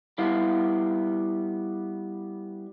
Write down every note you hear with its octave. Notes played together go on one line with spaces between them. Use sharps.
G3 B3 E4 F5